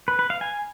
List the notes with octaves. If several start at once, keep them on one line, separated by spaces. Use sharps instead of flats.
B4
B4
F5
G#5